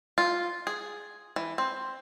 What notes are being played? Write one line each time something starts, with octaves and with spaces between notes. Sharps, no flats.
F4
G#4
E3
C4